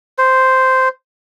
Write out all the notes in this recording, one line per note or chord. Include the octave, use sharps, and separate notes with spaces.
C5